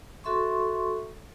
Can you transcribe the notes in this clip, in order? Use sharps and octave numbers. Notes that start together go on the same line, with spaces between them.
F#4 A4 E5 C6 C#6